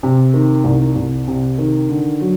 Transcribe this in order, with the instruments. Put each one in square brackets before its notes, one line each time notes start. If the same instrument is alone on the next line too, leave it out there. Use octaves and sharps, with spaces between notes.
[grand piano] C3
D#3
C2
C2
C3
D#3
D3
F#3